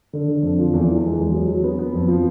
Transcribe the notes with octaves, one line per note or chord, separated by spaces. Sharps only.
D3
D3
F2
F3
E2
E3
G#3
E2
F#3
F#3
B3
B3
F2
F3